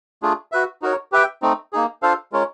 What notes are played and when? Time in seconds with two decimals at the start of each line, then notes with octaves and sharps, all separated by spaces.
0.22 A3 D4 F4 G#4
0.52 F#4 B4 E5
0.82 D#4 F#4 A#4 C#5
1.12 G4 B4 E5 G5
1.42 A3 C4 D#4
1.73 A#3 D#4 G#4
2.02 D4 F4 A4 C5 F5
2.32 G#3 C#4 F4 A#4 C#5